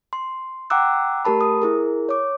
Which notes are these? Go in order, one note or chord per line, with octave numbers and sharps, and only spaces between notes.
C6
F#5 G5 A#5 D6 E6 F#6
A3 G4 A#4 A5 B5
D#6
E4 G#4 A#4
C#5 D6